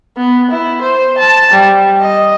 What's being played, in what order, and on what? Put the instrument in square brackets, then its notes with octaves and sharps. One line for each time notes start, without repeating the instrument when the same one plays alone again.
[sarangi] B3
E4
C5
A5
G3
D#5